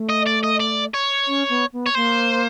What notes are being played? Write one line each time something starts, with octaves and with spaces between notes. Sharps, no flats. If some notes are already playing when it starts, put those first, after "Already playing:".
Already playing: A3
D#5
D5
D#5
D5
C#5
C#4
B3
B3
C#5
A#3 C5